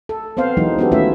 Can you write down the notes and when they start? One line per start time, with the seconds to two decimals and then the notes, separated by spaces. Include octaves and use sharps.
0.09 A4
0.37 B3 C4 C5 F5
0.57 E3 F#3 G#3 A#3 D#4
0.78 B3 C#4 F#4 G4 A4
0.92 D#3 A3 C#4 E4 F4 E5